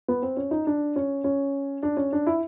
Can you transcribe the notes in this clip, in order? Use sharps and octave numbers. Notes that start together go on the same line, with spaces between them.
B3
C4
C#4
D#4
D4
C#4
C#4
D4
C#4
D4
E4